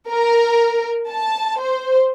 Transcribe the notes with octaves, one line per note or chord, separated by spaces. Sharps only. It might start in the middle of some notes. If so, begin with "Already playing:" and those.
A#4
A5
C5